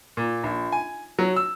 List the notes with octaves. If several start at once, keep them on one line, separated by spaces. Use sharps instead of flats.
A#2
A#1
G#5
F#3
E6